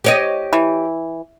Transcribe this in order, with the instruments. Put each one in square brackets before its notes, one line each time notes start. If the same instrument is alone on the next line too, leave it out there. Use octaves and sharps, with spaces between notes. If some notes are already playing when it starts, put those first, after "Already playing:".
[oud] G4 C#5 D#5
[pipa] E3